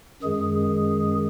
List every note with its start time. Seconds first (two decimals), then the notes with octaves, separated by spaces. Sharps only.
0.23 F#2 D#3 G#3 G#4